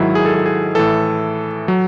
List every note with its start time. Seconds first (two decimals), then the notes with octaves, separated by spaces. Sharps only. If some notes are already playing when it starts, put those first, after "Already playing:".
Already playing: G#2 D#3 F#3 E4
0.15 G#4
0.26 A4
0.35 G#4
0.46 G#4
0.75 A2 E3 A4
1.68 F#3